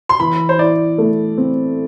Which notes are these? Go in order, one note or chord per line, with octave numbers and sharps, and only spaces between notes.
C6
E3 B5
C5
E4 D5
A3
C4